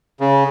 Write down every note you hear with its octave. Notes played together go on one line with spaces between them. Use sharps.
C#3